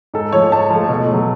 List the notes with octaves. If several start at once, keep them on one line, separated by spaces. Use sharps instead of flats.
G#2 A4
F3 A3 C#5
G#2 A5
F3 A3
B2
F#3 A3